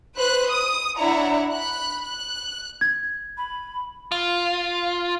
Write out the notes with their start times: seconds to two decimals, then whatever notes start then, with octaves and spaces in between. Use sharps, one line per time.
0.15 B4 C5 F#6
0.48 D#6
0.98 D4 E4 C#5 F#5 A#5
1.54 B5 F#6
2.03 F#6
2.81 G#6
3.37 B5
4.12 F4